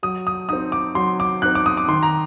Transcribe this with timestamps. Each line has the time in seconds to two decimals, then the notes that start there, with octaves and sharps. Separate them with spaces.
0.03 F#3 D#6
0.27 D#6
0.49 C4 D#4 D#6
0.72 D6
0.95 F#3 C6
1.20 D6
1.42 C4 D#4 F#6
1.55 D6
1.66 D#6
1.77 D6
1.88 D#3 C6
2.03 A#5